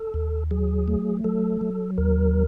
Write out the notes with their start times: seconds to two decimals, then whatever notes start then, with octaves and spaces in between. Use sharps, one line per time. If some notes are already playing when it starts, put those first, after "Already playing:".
Already playing: A4
0.14 D#2
0.51 F#3 G#4
0.88 A3
1.24 F#3 A4
1.61 F#3
1.98 D#2 A#4